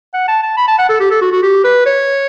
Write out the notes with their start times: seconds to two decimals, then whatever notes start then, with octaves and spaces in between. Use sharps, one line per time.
0.14 F#5
0.28 A5
0.43 A5
0.57 B5
0.68 A5
0.79 F#5
0.89 A4
1.00 G4
1.11 A4
1.22 F#4
1.32 F#4
1.43 G4
1.64 B4
1.86 C#5